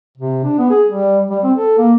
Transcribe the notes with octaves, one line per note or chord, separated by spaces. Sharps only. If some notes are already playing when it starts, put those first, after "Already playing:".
C3
D4
B3
G#4
G3
G3
C4
A4
A#3